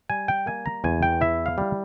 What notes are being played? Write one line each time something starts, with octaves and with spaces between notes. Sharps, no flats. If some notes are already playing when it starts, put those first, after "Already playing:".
G3 G#5
G5
A#3 G#5
A#5
E2 G#5
G5
E4 E5
F5
G3